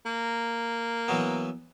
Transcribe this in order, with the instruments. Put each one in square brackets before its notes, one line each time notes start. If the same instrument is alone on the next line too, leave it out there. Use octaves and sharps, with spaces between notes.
[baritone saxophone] A#3
[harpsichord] E3 F#3 B3